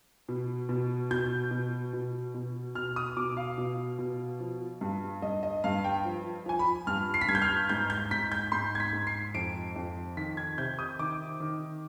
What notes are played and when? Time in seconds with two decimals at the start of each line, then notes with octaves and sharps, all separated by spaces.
0.29 B2
0.69 B2
1.11 B2 G6
1.51 B2
1.93 B2
2.34 B2
2.75 B2 F6
2.96 D#6
3.17 B2 D6
3.37 F5
3.58 B2
3.99 B2
4.40 F3
4.81 G2
5.22 G2 D#5
5.43 D#5
5.64 G2 F5
5.84 G5
6.05 F3
6.46 F3 G#5
6.59 B5
6.87 G2 F6
7.14 C7
7.21 B6
7.28 G2 G#6
7.35 G6
7.42 F6
7.69 G#2 G6
7.90 G6
8.11 G#2 B6
8.32 G6
8.52 G#2 C6
8.75 G#6
8.80 B6
8.93 G#2
9.07 C7
9.34 F2 D7
9.76 F2
10.17 D#3 B6
10.37 G#6
10.58 C3 G6
10.79 D#6
10.99 D#3 D6
11.40 D#3